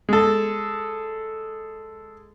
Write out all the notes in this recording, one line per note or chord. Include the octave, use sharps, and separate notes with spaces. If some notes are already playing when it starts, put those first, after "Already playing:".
G#3 A4